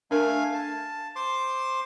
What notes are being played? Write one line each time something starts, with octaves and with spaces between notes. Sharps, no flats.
A3 D4 A#4 F5 G#5
A5
C5 C6 D6